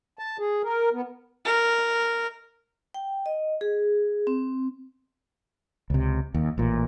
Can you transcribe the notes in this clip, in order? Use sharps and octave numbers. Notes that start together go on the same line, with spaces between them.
A5
G#4
A#4
B3
A#4
G5
D#5
G#4
C4
C#2 C3
D#2
A1 A#2